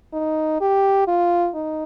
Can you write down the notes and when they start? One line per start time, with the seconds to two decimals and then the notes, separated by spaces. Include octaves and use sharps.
0.13 D#4
0.61 G4
1.07 F4
1.55 D#4